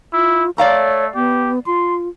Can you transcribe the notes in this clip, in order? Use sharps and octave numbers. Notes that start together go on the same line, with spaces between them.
E4 F4
A3 C#5 D5 F5 A#5
B3 G4
F4 C6